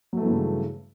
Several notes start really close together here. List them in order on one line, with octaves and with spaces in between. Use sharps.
F#3 A3 E3 G2 C#3